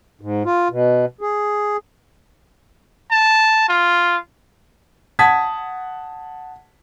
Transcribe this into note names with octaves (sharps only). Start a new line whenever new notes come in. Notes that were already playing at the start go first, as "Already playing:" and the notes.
G#2
F4
B2
G#4
A5
F4
F#5 A5 D#6 G#6 B6